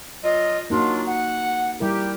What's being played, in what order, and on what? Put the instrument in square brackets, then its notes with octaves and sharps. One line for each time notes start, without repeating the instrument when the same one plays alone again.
[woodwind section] F#3 F4 D#5
[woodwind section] F#3 D4 F4 [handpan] A#3 D#4 F#4
[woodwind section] F#5
[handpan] G3 E4 A#4 [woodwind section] G4